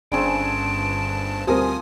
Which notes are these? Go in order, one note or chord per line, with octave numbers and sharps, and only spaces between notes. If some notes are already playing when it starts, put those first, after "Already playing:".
G1 G2 C#3 C4 D4 G#4 A5 D7
D2 F3 G3 C4 A#4 G#5 D#6